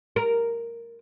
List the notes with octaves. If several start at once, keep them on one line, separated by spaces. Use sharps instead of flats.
A#4